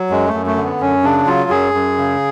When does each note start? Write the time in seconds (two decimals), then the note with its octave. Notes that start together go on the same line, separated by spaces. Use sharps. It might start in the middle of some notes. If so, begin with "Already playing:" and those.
Already playing: F#3
0.10 F#2 G#3
0.28 A3
0.34 F#2
0.46 A3
0.57 D3
0.63 B3
0.81 F#2 C#4
1.03 C#3 D4
1.27 F#3 F4
1.50 F#2 G#4
1.74 F#2
1.98 C#3